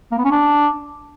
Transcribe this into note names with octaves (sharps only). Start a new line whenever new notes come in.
A#3
B3
C#4
D4